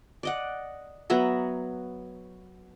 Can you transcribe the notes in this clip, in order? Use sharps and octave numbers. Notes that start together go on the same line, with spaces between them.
D5 D#5 F#5
F#3 B3 E5 A#5